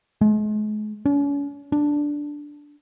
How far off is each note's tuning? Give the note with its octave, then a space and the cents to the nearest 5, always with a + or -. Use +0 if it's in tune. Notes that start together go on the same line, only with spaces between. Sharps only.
G#3 +40
C#4 +40
D4 -5